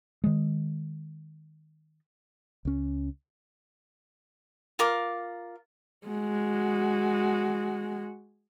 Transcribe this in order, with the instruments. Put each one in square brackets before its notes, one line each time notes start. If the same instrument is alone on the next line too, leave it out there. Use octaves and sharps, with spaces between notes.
[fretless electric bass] D#3 G#3
C#2 C#4
[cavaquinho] F4 A#4 D6
[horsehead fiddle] G#3 F#4